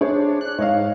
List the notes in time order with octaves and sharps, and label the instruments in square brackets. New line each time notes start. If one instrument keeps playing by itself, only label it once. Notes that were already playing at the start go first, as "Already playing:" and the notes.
[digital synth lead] D4 [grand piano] G#4 C5 C#5
[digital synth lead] F#6
[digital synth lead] G#2 [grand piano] C#5 D#5 F5